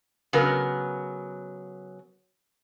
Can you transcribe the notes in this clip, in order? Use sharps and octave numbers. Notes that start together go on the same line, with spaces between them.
C#3 F#3 B3 A#4